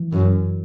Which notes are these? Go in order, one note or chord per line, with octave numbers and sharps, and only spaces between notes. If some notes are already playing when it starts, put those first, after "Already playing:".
Already playing: E3
F#2